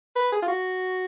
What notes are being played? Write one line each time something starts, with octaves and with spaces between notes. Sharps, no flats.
B4
G#4
F4
F#4